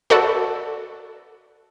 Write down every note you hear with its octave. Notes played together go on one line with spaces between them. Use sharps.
F#4 A4 B4 D5